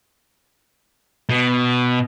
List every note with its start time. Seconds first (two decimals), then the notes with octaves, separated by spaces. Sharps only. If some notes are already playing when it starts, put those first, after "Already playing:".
1.29 B2